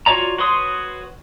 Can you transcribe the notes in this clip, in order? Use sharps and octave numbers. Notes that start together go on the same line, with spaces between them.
F4 F#4 C#5 D5 A#5
F#4 B4 C#5 C6 D#6